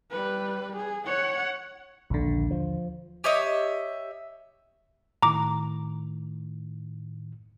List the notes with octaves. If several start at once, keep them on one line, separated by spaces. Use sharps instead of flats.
G3 B4
G#4
C#5 F#5
A#1 D#2 D3
F3
G4 C#5 D#5 E5
A2 D#3 A#5 D6